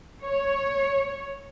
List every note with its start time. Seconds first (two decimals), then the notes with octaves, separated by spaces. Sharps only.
0.23 C#5